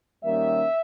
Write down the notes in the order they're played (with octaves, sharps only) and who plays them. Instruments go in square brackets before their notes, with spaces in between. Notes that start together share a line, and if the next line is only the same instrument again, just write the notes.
[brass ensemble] D#2 D#3 G3 A#3 C#4 E5